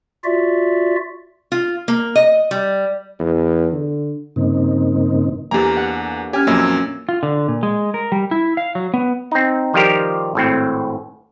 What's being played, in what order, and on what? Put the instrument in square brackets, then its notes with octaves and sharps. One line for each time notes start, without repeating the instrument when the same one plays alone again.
[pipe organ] F4 F#4 D5 E5
[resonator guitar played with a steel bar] F4
A#3
D#5
G3
[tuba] E2
D3
[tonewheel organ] G2 C#3 A#3 C4 D#4
[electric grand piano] E2 A#5 [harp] A#3 D4 A4 [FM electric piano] G4 F5 G#5
[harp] F#5
[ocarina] C#4 [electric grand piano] G4 [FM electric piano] C#5 [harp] G#5 F6 G#6
[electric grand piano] F2 A#2 F#3 [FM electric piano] A#3 [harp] E5 E6
[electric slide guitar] F4
D3
A#2
G#3
A#4
G3
E4
F5
F#3
B3
[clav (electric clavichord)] C4 D#4
D#3 F3 G3 F4 G4 A#4
G#1 A2 C4